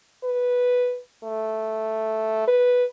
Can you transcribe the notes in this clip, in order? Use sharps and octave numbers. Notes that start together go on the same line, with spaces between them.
B4
A3
B4